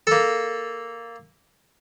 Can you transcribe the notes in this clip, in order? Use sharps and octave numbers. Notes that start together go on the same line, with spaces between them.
A#3 A4